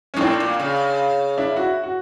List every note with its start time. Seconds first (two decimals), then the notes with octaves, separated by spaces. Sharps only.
0.14 C#4
0.16 G#2
0.21 A2 C4 D4
0.40 A#2
0.60 C#3
1.38 D4 E4
1.56 E4 F#4
1.84 F#4